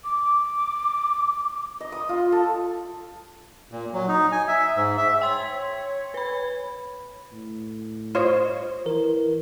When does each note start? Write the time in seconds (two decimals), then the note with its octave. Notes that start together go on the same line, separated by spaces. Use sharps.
0.04 D6
1.80 D#5
1.92 D#6
2.09 F4
2.32 A4
3.72 A#2
3.93 F#3
4.08 D#4
4.32 G#5
4.48 E5
4.76 G#2
4.97 E5
5.22 C#5 G5 C6 B6
6.14 B4 B5
7.33 A2
8.15 F4 C5 C#5 D#5
8.86 E3 A#4